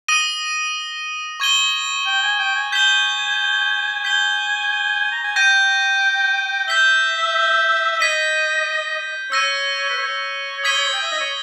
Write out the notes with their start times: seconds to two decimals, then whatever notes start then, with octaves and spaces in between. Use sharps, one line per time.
0.08 D#6 A#6 D#7 G7
1.40 C#6 G#6 D#7 G7
2.06 G5
2.22 G#5
2.39 G5
2.56 G#5
2.72 G#5 G6 B6 E7 G7
4.04 G#5 G6 B6 G7
5.12 A#5
5.23 G#5
5.36 G5 G6 A#6 D#7
6.68 E5 G6 B6 G7
7.91 E5
7.99 D#5 G#6 B6 D#7 G7
9.32 C#5 E6 A#6 D#7
9.90 B4
9.97 C#5
10.64 D#6 G#6 B6 D#7 G7
10.93 G5
11.02 E5
11.12 D#5
11.20 C#5